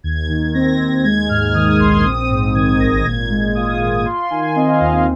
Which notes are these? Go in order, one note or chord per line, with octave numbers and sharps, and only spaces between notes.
D#2 G#6
D#3
C4 A#6
D#2
G#3 G#6
G#2 F6
D#3 D#6
A#1 C6
C4 D#6
G#2
D#3 G#6
G#1 A#6
A#2 G#6
G#3
F4 D#6
A#2 D#6
F4 C6
D#3 G#5
C4 D#5
F5
D#2 F5
F5